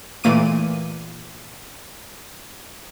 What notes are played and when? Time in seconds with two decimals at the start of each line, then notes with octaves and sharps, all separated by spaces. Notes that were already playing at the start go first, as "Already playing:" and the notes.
0.24 A#2 E3 A3 A#3 D6 D#7